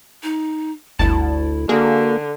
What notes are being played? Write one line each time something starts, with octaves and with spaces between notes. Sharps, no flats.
D#4
G1 D2 E4 A5
D3 A#3 F#4 G#4